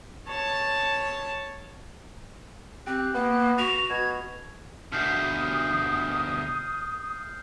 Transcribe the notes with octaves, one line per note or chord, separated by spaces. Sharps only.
C#5 A5
C4 G4 F#6
A#3 B3
F#4 F7
B2 G#6
D2 B2 D#6 F6 G6 C7